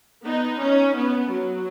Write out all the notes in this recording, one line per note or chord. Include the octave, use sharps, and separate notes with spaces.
B3 D#4
C#4
B3
F#3